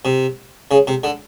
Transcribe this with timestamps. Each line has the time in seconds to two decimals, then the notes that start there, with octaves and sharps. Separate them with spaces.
0.05 C3
0.71 C#3
0.87 C3
1.04 D3